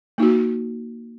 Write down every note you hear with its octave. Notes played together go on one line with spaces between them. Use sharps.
A#3 D#4 F#4